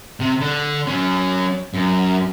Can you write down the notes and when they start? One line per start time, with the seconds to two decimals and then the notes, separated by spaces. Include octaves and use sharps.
0.20 C3
0.40 D3
0.87 F#3 C#4
1.74 F#2